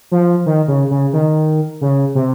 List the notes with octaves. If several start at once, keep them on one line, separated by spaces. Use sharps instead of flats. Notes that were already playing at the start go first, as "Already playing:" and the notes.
F3
D#3
C#3
C#3
D#3
C#3
C3